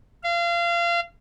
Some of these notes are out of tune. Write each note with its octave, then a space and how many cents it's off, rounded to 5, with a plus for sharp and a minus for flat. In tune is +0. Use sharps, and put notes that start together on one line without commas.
F5 -30